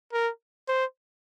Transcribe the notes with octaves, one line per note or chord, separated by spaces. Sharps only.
A#4
C5